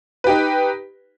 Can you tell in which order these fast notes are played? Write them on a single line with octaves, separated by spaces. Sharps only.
B4 G4 D#4